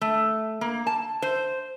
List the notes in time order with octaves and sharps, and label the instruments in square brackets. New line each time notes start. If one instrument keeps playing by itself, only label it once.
[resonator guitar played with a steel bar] A3
A#3
A5
C5